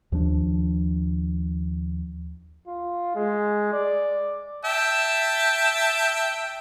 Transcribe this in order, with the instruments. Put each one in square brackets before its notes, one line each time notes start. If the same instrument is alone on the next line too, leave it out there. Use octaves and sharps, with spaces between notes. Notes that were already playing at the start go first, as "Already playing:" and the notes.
[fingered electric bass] D#2 F3 D4
[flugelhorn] F4
G#3
D5
[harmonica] E5 G5 A5